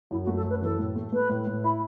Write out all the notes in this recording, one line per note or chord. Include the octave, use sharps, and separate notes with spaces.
F#2 E4
F#4
A3
A4
F#2 B4
E3 A4
A2
A3
A3 B4
A2
A2
E4 B5